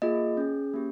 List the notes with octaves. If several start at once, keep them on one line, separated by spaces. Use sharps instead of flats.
A#3 F4 G#4 D#5
C#4 G#4
A#3 C#4 G4